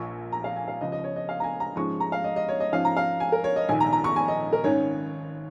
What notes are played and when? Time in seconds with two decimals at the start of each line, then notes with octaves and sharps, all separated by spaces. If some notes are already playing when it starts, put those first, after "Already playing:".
Already playing: A#1 A#2 A#3 C#6
0.32 A#5
0.44 F5
0.56 G#5
0.68 F5
0.81 C#2 C#3 F3 D#5
0.92 D#5
1.04 C#5
1.16 D#5
1.29 F5
1.40 A#5
1.44 G#5
1.60 A#5
1.76 G#2 F3 G#3 C#4 C#6
2.00 A#5
2.12 F5
2.24 D#5
2.36 D#5
2.49 C#5
2.60 D#5
2.72 G#2 F3 C#4 F5
2.85 A#5
2.97 F5
3.20 G#5
3.32 A#4
3.44 C#5
3.56 D#5
3.69 A#1 G#2 D#3 G#5
3.80 A#5
3.93 A#5
4.04 C#6
4.16 G#5
4.28 D#5
4.53 A#4
4.64 G#1 G#2 D#3 C#4 C#5